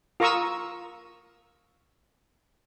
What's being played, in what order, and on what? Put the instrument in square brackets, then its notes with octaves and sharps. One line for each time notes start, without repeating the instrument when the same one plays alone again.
[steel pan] F4 A#4 A#5 C#6 D#6 E6